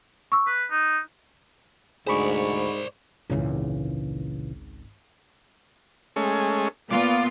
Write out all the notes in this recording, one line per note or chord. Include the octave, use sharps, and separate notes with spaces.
C#6 E6
B4 F#6
D#4
D2 G#2 G#4 C5 D5 B5 C#6
G#1 C#2 A#2 C#3 E3
G#3 A3 C#4
A#2 B3 F4 D6